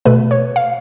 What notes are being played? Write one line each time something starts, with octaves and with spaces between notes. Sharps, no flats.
B2 A3 B4
C#5
F5